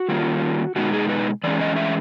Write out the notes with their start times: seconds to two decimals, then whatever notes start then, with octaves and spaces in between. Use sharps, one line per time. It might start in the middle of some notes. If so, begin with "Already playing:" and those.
Already playing: F#4
0.09 D#3 G3 A#3 C#4 F4
0.76 B2 G#3 B3 D#4 F#4
0.93 G#4
1.09 B4
1.44 E3 G#3 C#4 D5
1.61 D#5
1.76 E5